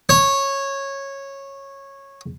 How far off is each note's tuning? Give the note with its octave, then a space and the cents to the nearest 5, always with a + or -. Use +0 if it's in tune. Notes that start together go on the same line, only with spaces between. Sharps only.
C#5 -15